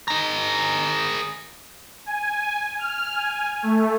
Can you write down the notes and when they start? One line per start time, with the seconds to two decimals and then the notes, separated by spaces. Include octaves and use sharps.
0.08 G#4 A#4
2.06 G#5
2.79 F6
3.13 G#5
3.63 A3